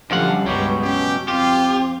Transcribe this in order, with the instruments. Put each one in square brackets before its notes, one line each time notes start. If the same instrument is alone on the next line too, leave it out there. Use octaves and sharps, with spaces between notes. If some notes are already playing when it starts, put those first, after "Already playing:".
[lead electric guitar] F#2 F#5 [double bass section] D3 F3 G3 [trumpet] F5
[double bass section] C#2 G2 [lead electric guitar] B2 F#3 [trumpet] G4
[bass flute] C#4 [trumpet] G4
[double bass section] F2 [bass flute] C4 [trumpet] F4 [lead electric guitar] G4